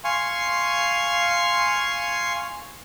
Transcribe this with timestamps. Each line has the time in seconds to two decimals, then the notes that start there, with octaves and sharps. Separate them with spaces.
0.04 F5 G#5 C6 C#6